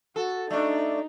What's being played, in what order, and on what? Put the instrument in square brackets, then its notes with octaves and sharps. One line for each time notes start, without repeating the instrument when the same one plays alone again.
[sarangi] F#4 [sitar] A4
[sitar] A3 D4 [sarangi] D#4 [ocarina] D5